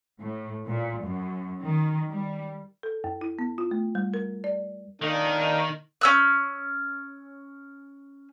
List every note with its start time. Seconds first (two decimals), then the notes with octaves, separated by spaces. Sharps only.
0.21 A2
0.68 A#2
1.04 F#2
1.63 D#3
2.12 G3
2.83 A4
3.04 F#2
3.21 E4
3.39 B3
3.58 F4
3.71 A3
3.95 G3
4.14 A#4
4.44 D5
5.02 D#3 A#3 D4 D#4
6.01 C#4 E6 F#6